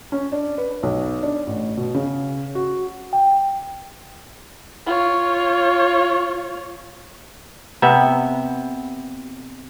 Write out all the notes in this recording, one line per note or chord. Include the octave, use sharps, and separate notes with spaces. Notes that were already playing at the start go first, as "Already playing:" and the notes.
C#4
D4
B4
B1
D4
A1
B2
C#3
F#4
G5
F4 C#5
C3 B3 E5